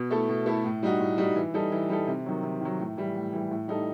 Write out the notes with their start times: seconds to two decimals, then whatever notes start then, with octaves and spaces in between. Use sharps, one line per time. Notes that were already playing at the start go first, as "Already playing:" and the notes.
Already playing: B2
0.11 A3 E4 A4
0.29 B2
0.46 A3 E4 A4
0.64 A2
0.83 G3 D#4 F#4
1.00 A2
1.18 G3 D#4 F#4
1.36 E3
1.54 G3 D#4 A4
1.72 E3
1.89 G3 D#4 A4
2.07 C3
2.26 D#3 F#3
2.43 C3
2.61 D#3 F#3
2.79 A2
2.97 E3 G3
3.15 A2
3.33 E3 G3
3.51 A2
3.68 G3 D#4 A4